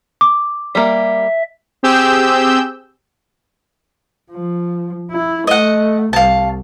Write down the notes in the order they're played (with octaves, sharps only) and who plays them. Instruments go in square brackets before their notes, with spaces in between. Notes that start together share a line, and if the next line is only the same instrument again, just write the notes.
[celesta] D6
[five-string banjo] G3 A#3 [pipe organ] E5
[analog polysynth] C4 G4 G#4 E6 G6
[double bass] F3
E4
[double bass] A3 [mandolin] D#5 F#5
[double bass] C2 [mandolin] F5 A5